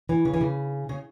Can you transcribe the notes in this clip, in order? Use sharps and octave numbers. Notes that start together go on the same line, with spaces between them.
E3
C#3
E3
C#3
C#3